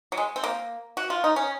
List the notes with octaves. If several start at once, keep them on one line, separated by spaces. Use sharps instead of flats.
F#3
G#3
C4
A#3
F#4
F4
D#4
C#4